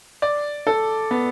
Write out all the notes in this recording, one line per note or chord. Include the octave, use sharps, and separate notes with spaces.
D5
A4
B3